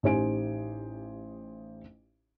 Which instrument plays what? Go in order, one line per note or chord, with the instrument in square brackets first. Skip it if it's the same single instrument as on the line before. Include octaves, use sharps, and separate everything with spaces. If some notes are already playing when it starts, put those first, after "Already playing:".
[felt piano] A1 D#4 G4 C5 G#5 D7